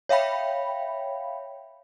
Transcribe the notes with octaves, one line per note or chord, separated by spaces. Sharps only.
C#5 E5 F5 G5 B5